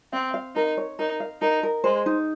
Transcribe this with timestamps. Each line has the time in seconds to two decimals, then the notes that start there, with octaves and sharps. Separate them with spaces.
0.12 C4 F5
0.34 F5
0.56 D#4 A#4
0.77 C#5
0.99 D#4 A#4
1.20 F5
1.41 D#4 A#4
1.63 A#4
1.84 G#3 C5
2.06 D#4